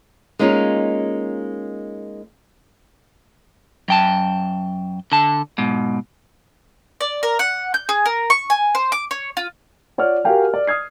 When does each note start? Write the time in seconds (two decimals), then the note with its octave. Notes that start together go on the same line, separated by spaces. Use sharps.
0.39 G#3 A#3 C#4 D#4 F4
3.88 F#2 G5 A5
5.12 D3 A5
5.58 G#2 B2
7.01 D5
7.23 A#4
7.39 F#5
7.74 G6
7.89 G#4
8.06 A#4
8.30 C#6
8.50 G#5
8.75 C5
8.92 D6
9.11 C#5
9.37 F4
9.98 F4 C#5 D5 F#5 F6
10.24 F#4 G4 A#4 F5 G5 G#5
10.54 D5
10.67 D#6 F6 G#6 C7